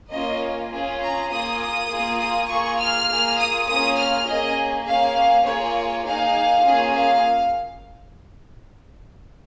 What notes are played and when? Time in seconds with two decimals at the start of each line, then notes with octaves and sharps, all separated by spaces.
0.11 A#3 C#4 F4 D#5
0.71 C#4 F4 G#4
1.00 A#5
1.30 A#3 F4 G#4 D#6
1.60 D#6
1.90 A#3 F4 G#4
2.19 D#6
2.48 A#3 F4 G#4 C#6
2.78 F6
3.08 A#3 F4 G#4
3.37 D#6
3.67 A#3 C#4 F4 G#4 D#6
3.96 F6
4.27 A#3 C#4 G#4 D#5
4.85 A#3 C#4 G#4 F5
5.45 A#3 F4 G#4 C#5
6.05 A#3 D#4 G#4 F5
6.64 A#3 C#4 F4 G#4
6.94 F5